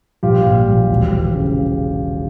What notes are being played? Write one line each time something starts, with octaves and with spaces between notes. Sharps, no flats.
A#1 F4 G4
A#2
A#1
E1
E2
C#3